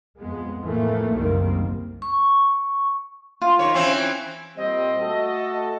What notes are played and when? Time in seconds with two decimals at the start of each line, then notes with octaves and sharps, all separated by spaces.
0.17 F2 G#3 B3
0.64 F2 A2 E3 A3 A#3
1.12 F#1 C2 D#3 G3 A#3 C4
2.02 C#6
3.42 F4
3.59 D#3 C#5
3.74 E3 C4 C#4
4.57 A#2 G3 C4 D#5
5.00 A3 F#4 A4